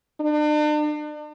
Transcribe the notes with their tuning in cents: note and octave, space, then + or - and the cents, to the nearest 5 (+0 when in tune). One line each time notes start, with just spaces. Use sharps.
D4 +40